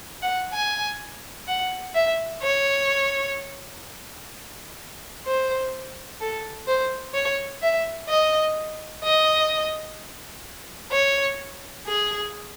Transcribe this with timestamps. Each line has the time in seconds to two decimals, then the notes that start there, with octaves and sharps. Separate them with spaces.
0.22 F#5
0.53 G#5
1.48 F#5
1.94 E5
2.42 C#5
5.25 C5
6.20 A4
6.67 C5
7.14 C#5
7.62 E5
8.09 D#5
9.04 D#5
10.92 C#5
11.87 G#4